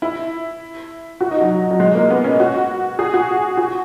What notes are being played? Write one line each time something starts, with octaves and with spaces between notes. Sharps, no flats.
E4
F#4
D#4
F#3
F#3
G#3
A#3
B3
C#4
F#4
G#4
F#4
F#4